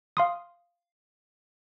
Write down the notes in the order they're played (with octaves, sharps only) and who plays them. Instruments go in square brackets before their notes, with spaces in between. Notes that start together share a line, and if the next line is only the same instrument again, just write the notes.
[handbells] F5 C6 D#6